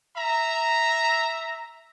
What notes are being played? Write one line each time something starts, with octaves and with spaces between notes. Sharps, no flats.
E5 A#5